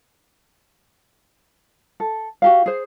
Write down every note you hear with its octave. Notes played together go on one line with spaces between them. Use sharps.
A4
F#4 G4 F5
G#4 C5